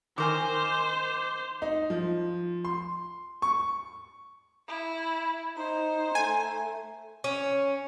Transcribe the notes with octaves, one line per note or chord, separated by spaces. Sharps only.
D#3 A#4 C5 G#5 D6
D#4
F3
C6
C#6
E4
D#4 C5 A#5
A3 G#5
C#4